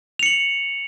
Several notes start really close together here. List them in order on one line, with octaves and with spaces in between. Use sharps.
F7 C#7 F#7